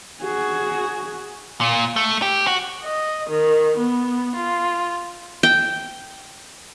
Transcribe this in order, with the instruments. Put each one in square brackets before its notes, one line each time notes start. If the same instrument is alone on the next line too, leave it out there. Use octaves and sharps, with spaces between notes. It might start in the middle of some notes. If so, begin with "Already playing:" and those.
[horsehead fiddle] F#4 G#4
[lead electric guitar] A#2
A3
G4
F#4
[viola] D#5
D#3
B3
F4
[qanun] G5